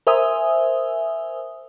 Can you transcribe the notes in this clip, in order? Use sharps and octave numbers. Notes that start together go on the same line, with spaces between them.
A#4 C5 E5 G#5 D#6 E6